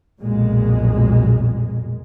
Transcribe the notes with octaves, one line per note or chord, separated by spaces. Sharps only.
B1 F2 A#2 G#3